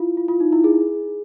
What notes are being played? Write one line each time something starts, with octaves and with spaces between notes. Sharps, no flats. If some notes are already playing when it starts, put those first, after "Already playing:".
Already playing: E4 F4
F4
F4
D#4
E4
G#4